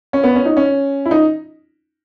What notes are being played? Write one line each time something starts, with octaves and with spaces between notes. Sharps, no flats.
C#4
B3
C#4
D#4
C#4
E4
D#4